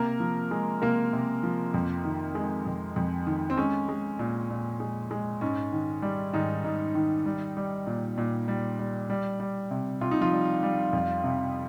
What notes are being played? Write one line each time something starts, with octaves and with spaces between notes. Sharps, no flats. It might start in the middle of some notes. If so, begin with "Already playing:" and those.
Already playing: C3 A#3 A#4
F3
G#3
C3 A#3 A#4
C3
F3
F2
D#3
G#3
F2
F2
D#3
C4
G#3 C#4
G#3
A#2
A#2
G#3
G#3
G#2 C#4
D#3
G3
G#2 D#3 D#4
G#2
D#3
G3
G3
A#2
A#2
G3
G3
G3
G3
C3
C3 F4
D#4
F3 F4
G3
G3
F2
C3